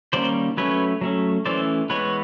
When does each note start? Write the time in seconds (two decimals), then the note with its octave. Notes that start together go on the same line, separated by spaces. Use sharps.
0.13 D#3 G3 A#3 C#4 C5 D5
0.57 F#3 A3 C#4 B4 C#5
1.01 F#3 A3 C#4
1.45 E3 A3 C#4 C5 D5
1.90 E3 G#3 B3 B4 C#5